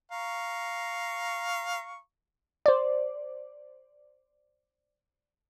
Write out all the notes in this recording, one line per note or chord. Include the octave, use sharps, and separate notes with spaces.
F5 A#5 C#6
C5 D5